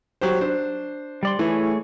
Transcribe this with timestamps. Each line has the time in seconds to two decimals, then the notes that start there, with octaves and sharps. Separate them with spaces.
0.21 F#3 G4 C5
0.41 D4 C5
1.23 G3 D5 C6
1.39 E3 A3 G#4 C#5